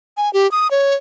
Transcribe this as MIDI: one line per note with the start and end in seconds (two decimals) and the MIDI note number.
0.17 0.32 80
0.33 0.50 67
0.52 0.70 87
0.71 0.95 73